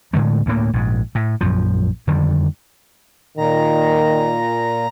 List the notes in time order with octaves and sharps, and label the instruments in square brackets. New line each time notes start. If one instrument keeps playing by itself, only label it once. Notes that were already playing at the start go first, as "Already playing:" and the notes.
[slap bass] A2 D3 G#3 A3
D2 A2 A#3
A#1 G#2
A2
A#1 F#2 F3
F2 D3 D#3 G3
[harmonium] A#2 [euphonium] D#3 [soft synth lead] A#5